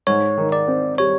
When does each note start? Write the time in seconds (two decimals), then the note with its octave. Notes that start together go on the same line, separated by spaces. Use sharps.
0.07 G#2 C#5
0.38 D#3
0.52 D5
0.68 C4
0.98 G3 C#5